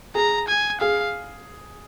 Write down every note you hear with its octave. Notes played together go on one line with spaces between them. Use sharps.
G#4 A#5
G#5
G#4 F5